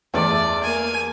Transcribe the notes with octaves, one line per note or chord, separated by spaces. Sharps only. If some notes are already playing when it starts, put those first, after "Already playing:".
E2 A3 D5 D6
A#3 G#5